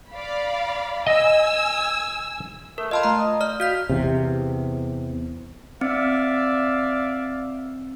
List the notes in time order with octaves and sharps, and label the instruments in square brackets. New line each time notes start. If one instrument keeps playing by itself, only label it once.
[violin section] D5 F5 B5
[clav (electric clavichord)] D#5 [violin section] G#5 E6
[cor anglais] A3 [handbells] A#4
[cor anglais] F4 [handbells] D#5 A5 B5
[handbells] A3 A#5
[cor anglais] D#5
[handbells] D5 F6
[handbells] F#4 G6 B6 [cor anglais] F5
[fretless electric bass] E2 C3
[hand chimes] C4 [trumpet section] D5 E5 F5